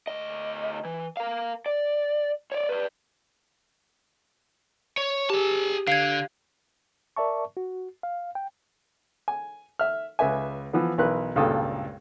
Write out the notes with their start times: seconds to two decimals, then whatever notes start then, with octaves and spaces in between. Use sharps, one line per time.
0.07 D2 D#5
0.85 E3
1.17 A#4 F5
1.66 D5
2.52 C#5 D5
2.69 B4 D5
4.97 C#5
5.30 G4 G#4 A5
5.88 D3 F5 G#6
7.17 A#4 D5 E5 A5 C#6
7.57 F#4
8.03 F5
8.35 G5
9.28 G#5
9.79 E5 F6
10.19 C#2 B4 E5 G#5
10.73 E3 F3 B3
10.98 B1 E3 A#4 B4 F#6
11.35 G#1 C#2 G2 A#2 A4 D#6